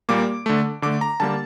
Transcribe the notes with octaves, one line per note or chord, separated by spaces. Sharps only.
A#2 G3 A#3 D6
D3 A3
D3 A3 D6
A#5
D3 G3 A#3 A5